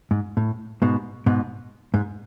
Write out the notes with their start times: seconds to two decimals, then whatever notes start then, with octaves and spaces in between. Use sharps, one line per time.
0.11 G#2
0.37 A2
0.82 G#2 B2
1.26 G#2 B2
1.94 G#2